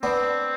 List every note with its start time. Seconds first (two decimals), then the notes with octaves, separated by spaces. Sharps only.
0.03 B3 C4 D4